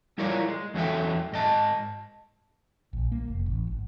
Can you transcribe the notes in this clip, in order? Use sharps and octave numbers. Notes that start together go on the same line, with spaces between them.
G3 E4 F4 A#4 C#5 D5
G#3
E2 F#3 C#4 A4 E5 G5
G#2 D#5 A5
A#1
A#3
F1
A1
G#1